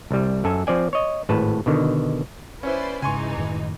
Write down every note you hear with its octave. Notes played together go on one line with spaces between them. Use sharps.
C2 G3
F#2 A4 G#5
F3 C4 D5 G#5
C#5 D#5
G#1 A2 B4 A5
B2 D3 D#3
C#4 E4 B4 C5 D5
G#2 C#3 E3 G#3 D#4 G#5 C6 C#6
F#2 A2 D#3